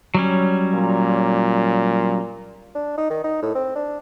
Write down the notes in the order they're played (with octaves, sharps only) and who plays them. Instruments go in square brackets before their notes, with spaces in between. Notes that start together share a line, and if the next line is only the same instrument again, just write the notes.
[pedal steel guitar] F#3 G3 C#4
[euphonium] A#2
[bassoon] D4
D#4
D#3
D#4
A2
C4
D4